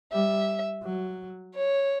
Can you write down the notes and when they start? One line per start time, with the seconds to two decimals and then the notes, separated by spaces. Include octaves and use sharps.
0.12 G3 E5
0.83 F#3
1.55 C#5